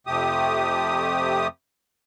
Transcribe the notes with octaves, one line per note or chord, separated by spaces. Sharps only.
F2 C3 A3 G4 D#6